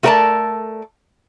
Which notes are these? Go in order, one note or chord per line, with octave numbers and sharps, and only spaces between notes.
A3 F#4 A#4 B4 D5 A5